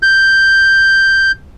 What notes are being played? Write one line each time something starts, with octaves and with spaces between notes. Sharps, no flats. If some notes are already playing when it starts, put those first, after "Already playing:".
G6